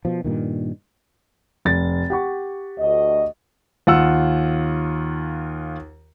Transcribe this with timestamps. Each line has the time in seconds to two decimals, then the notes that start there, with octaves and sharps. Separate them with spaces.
0.05 B2 F3
0.24 G2 A#2 D#3
1.65 F1 A6
2.10 G4 F#5 C#6
2.79 D2 D#5
3.87 D#2 F4 F#5 E6